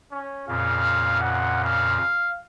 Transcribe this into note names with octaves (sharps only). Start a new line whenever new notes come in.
C#4
F2 A#2 C#3 F5
F#5
F5